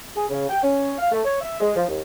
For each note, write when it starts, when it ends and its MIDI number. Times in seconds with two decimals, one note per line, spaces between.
0.16 0.25 68
0.30 0.44 49
0.49 0.60 79
0.63 0.94 61
0.99 1.10 77
1.12 1.20 57
1.25 1.40 73
1.41 1.59 76
1.60 1.73 56
1.76 1.87 53
1.88 2.01 39